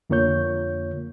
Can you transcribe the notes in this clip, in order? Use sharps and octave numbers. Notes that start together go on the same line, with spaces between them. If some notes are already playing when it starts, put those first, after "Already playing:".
F2 D3 A#3 F4 C#5 G6